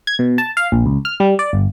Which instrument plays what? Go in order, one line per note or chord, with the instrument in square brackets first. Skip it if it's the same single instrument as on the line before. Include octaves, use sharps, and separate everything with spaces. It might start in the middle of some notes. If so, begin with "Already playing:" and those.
[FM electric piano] G#6
B2
A5
F5
A#1
C#2
F6
G3
D5
G1